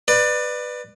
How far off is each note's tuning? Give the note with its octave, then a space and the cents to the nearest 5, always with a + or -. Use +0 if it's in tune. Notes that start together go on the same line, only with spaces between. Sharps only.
B4 +0 D5 +25